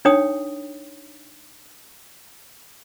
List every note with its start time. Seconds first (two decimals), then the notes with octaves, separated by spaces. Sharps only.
0.05 D4 D#4 C#5 G5 D#6